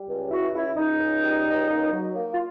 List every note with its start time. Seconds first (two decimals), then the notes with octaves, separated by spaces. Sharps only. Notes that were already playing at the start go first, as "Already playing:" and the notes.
Already playing: G3
0.09 C#2
0.31 C#2 E4 F#4
0.54 C#2 E4
0.77 C#2 D#4
1.00 C#2
1.23 G3
1.46 C#2
1.69 A#3
1.92 F#3
2.15 A#3
2.33 F4